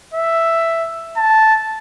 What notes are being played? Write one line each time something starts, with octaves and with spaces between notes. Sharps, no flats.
E5
A5